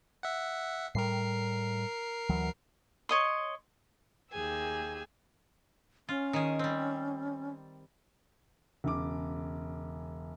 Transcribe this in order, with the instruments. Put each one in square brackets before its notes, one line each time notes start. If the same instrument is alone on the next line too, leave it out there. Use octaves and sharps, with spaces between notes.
[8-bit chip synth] E5 F#5
[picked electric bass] A2 G3 [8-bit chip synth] A#4 C7
[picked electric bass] D2 E3 F#3
[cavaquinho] C#5 D#5 C6
[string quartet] D#2 G4 G#4 G#5 E6
[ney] C#4 [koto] F4
[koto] D#3 G#4
G3 C4
[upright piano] E1 C#3 D6